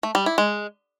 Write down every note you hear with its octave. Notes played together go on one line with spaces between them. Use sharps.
A3
G3
E4
G#3